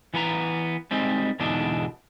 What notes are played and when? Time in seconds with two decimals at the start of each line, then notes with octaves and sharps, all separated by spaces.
0.14 E3 B3 B4 A#5
0.91 G3 G#3 C4 D#4
1.40 E2 G#2 B2 D3 D4 D#4